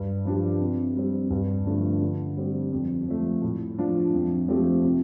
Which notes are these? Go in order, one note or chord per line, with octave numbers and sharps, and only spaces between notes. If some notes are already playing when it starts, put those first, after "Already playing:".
Already playing: G2
F3 D4 G4
C3
G3 C4
G2
D3 F3 A3 D4
D3
G3 C4 G4
F2
F3 A3
A2
F3 D4 F4
F2
F3 A3 C4 G4
C3